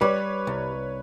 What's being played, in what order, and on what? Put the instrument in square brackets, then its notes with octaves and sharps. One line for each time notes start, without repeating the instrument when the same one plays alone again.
[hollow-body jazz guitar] G3 [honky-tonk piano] B4 C#5
[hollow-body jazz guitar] C2